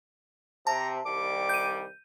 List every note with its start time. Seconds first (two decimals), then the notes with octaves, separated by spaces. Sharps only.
0.67 C3 A5 A#5
1.06 C2 D#3 G3 D6
1.49 G6 D#7